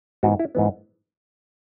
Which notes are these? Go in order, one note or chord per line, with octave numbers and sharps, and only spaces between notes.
G#2 E3 B3 F#4
E4
G#2 E3 B3